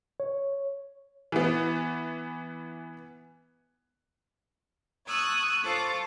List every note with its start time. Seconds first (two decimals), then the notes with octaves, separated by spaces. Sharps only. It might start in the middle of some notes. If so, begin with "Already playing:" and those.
0.20 C#5
1.32 E3 B3
5.06 A5 C#6 D#6 E6 F#6 G#6
5.63 F4 A4 C5 A5 C#6 D6